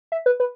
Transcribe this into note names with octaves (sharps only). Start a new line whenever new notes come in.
E5
B4
B4